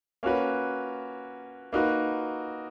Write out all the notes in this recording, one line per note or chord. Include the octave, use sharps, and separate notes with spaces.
A#3 C#4 F#4 B4
A#3 D#4 F#4 B4